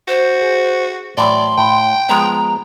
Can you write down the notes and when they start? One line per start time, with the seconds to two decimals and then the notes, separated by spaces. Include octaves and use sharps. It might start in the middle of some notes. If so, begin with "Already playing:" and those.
0.08 F#4 C5
0.42 G#4
1.18 A2 E3 F#3 D5 C6
1.58 A2 G5
2.09 F3 G#3 B3 A#5